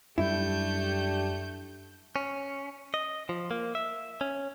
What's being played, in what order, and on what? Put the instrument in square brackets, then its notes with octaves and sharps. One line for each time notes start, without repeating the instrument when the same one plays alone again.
[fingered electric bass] F#2 G3 [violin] A3 G6 [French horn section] D4 G4 [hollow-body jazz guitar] E4
[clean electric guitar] C#4
D#5
F3
A#3
E5
C#4